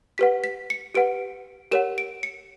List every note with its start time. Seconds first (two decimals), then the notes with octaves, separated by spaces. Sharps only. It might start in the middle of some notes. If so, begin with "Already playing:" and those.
0.18 G4 B4 F#5 B6
0.44 B6
0.70 C#7
0.95 G4 B4 F#5 D7
1.71 G4 A#4 C#5 F#5 E7
1.98 D7
2.23 C#7